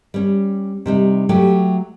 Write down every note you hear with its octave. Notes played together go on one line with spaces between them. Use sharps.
G3 C#4
C3 G3 D#4
F#3 A3 G4